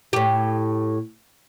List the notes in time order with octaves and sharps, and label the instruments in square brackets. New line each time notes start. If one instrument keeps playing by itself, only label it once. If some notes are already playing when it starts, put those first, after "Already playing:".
[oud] A2 G4